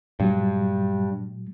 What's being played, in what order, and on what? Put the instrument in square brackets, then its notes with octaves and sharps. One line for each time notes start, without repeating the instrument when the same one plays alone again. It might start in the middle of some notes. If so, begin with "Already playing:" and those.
[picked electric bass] G2 [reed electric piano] A#2 F#3 G#3